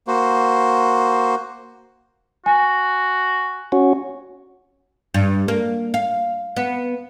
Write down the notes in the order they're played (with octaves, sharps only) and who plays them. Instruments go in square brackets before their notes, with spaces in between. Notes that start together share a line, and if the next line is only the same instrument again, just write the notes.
[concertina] A#3 F#4 C5
[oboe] F#4 [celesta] G#5
[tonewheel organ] C#4 F#4
[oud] G2
A#3
F5
B3